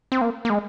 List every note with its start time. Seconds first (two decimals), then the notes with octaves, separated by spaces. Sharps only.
0.12 C4
0.21 A#3
0.45 A#3
0.50 G#3